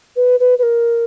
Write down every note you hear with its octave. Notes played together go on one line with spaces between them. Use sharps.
B4
B4
B4
A#4